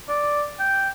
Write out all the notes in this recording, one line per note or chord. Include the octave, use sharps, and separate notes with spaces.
D5
G5